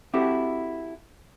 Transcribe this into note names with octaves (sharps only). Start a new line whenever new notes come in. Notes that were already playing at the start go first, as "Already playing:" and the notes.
C4 E4 F#4 G4 A4